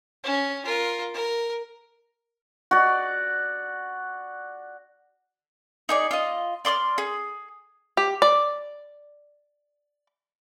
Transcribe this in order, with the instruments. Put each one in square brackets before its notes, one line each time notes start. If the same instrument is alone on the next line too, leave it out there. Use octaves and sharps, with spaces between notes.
[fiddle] C#4
F4 A#4
A#4
[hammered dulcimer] F#4 D5
[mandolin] D#4 G#4 D5
F4 D#5
D5 C6 D6 F6
G#4
[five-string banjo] G4
D5